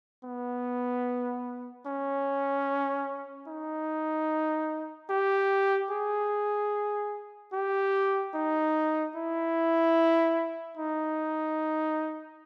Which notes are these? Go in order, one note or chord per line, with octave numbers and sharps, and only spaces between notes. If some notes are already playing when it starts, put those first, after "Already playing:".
B3
C#4
D#4
G4
G#4
G4
D#4
E4
D#4